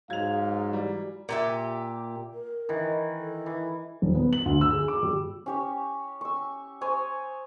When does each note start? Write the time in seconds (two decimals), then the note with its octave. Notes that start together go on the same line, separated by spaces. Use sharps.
0.10 G#2 F#3 F5 G#6 F7
0.72 E3 G3 A#5
1.29 A#2 G4 E5
2.33 A#4
2.69 D#3 E3
3.18 A4
3.46 E3
4.02 D#1
4.15 B3
4.33 F#7
4.46 D2
4.61 E6
4.73 G#4
4.88 D6
5.03 G3
5.46 C#4 G4 C#5
6.21 C#6 E6
6.81 C5 C#5 G#5 D#6